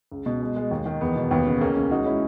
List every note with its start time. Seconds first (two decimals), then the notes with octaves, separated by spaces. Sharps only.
0.12 C#2
0.26 B2
0.41 G#3
0.56 G#3
0.71 D#2
0.86 D#3
1.01 E2 B3
1.16 B2
1.31 D#2 B3
1.47 C#3
1.61 C#2 A#3 C#4
1.76 C#3
1.91 G#3 D#4 F#4
2.06 G#3 C#4 E4